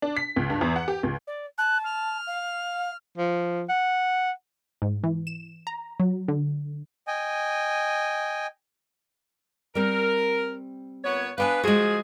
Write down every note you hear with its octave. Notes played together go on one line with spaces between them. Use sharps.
D4
B6
C#2
G2
E2
F#5
G4
C#2
D5
A5 F#6
F6
F5
F3
F#5
G#2
E3
E7
A#5
F#3
D3
D#5 G5 G#5
G3 C4 A#4
A#2 B3 C#5
B3 D4 B4 F5 G5 G#5
F3 G#3 F#4 G#4